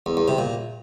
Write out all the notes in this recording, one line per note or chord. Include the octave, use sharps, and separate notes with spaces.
E2
E2
C3
A#2